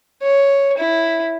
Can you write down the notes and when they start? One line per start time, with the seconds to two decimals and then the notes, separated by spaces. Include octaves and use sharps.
0.22 C#5
0.78 E4